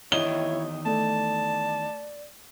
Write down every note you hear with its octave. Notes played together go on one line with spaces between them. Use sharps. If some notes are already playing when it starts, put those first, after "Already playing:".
E2 D#3 E4 C#5 D#5 G7
A3 D5 A5